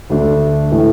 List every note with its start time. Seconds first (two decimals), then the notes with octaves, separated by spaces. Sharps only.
0.10 D2 D3 A3 D4
0.72 A2 E3 A3